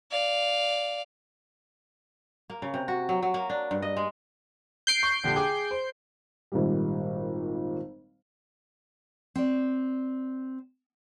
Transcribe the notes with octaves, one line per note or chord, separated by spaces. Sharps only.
D5 F5
A#3
C#3
C3
F#4
F#3
F#3
A#3
D4
G2
D#5
G#3
G6 C7 D7
C#6
A#1 D3 G4
G#4 G5 D6
C5
G#1 A#2 G3
C4 D5